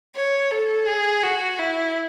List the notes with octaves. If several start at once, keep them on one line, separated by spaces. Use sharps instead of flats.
C#5
A4
G#4
F#4
E4